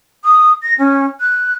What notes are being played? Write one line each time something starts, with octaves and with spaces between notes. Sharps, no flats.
D#6
A#6
C#4
F#6